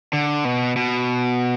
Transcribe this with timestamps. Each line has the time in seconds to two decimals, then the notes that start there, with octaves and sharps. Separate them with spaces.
0.13 D3
0.45 B2
0.76 B2